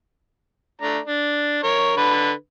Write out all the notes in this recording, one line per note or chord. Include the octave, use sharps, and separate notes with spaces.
A3 D4 A#5
D4
A#4 C#5
D3 B4